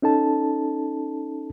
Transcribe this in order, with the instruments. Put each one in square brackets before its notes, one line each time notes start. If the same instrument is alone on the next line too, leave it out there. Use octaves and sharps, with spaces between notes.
[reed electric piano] C#4 D#4 A4 A5